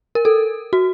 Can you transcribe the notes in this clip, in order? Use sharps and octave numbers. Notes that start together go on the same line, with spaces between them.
A#4
A4
F#4